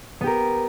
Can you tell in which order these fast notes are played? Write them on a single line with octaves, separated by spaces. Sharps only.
B3 G4 A#4